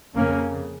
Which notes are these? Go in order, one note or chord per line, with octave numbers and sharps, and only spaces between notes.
F2 C#3 A#3 C#4